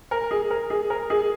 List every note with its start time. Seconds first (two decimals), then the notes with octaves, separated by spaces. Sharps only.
0.11 A#4
0.31 G#4
0.51 A#4
0.70 G#4
0.90 A#4
1.10 G#4